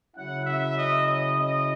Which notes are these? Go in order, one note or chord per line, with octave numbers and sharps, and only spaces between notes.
C#3 F#3 C#4 E4 F#5
E5
D#5
D#5
D#5